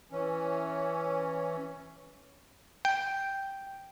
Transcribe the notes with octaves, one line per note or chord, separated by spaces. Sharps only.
E3 C#4
G5